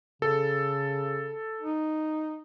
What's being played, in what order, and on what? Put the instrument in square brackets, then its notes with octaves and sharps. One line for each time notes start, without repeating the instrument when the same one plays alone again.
[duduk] C#3 [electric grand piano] A4
[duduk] D#4